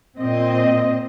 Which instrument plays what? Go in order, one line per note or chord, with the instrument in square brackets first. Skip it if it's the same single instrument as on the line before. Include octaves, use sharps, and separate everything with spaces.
[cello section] A#2 C4 D#5